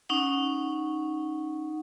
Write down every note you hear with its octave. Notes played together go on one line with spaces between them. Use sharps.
C#4 D#4 F#5